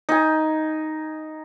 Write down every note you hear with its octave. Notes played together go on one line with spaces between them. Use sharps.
D#4 G#5